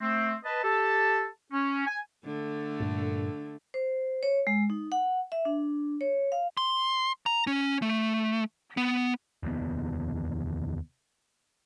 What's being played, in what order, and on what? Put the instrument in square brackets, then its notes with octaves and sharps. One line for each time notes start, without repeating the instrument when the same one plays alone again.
[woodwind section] A3 C4
B4 D#5 A5
G4 A4 A5
C#4
G#5
[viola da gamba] D3 A3
[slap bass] G2 A#2
[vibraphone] C5
C#5
G#3
D#4
F#5
E5
D4
C#5
F5
[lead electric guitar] C6
A#5
C#4
A3
B3
[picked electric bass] F1 D#2 C3 B3